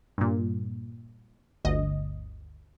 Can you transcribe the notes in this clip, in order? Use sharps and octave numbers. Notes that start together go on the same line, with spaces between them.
G2 A#2
G1 D2 D#5